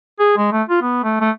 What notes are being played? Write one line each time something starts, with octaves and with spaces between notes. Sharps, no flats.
G#4
G#3
A3
F4
B3
A3
A3